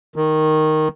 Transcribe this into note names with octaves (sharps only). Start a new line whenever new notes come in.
D#3